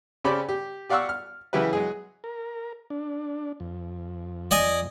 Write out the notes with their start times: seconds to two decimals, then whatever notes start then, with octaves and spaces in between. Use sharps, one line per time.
0.24 C#3 C4 C#4 G4 D5 B5
0.49 G4
0.89 G4 D5 F5 F#5 C#6 E6
1.09 F6
1.53 C#3 E3 F#3 E4 G4 B4
1.73 F#3 G#3 G#4
2.24 A#4
2.90 D4
3.60 F2
4.51 D5 D#5 G#5